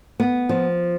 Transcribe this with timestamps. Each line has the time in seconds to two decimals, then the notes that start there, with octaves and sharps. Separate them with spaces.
0.20 B3
0.49 F3